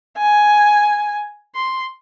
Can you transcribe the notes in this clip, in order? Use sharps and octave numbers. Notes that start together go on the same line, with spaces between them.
G#5
C6